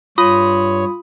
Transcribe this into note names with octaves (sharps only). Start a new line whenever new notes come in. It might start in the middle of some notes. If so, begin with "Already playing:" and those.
G2 F4 C#5 B5 D#6